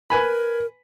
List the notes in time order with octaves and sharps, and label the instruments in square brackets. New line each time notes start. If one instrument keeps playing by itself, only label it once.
[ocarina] A#4 [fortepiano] B4 G#5 B5